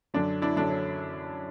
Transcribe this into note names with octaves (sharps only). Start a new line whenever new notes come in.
F#2 D3 F#3 D4
D4 E4
F#2 D3 F#3 D4
C#4